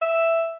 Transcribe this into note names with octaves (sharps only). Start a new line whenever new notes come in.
E5